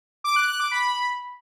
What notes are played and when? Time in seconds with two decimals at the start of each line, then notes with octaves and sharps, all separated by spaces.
0.24 D6
0.36 F#6
0.48 F#6
0.60 D6
0.71 B5